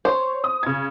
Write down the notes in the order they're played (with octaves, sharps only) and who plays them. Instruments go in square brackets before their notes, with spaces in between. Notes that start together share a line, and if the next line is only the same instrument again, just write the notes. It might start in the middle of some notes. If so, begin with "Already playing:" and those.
[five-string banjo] C5 [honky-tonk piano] C#5 C#6
[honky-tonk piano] D#6
C#3 G#6